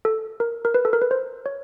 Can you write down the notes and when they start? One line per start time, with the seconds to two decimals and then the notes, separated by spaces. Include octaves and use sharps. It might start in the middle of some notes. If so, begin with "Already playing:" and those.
0.05 A4
0.40 A#4
0.65 A#4
0.74 B4
0.85 A4
0.93 A#4
1.01 B4
1.11 C5
1.46 C#5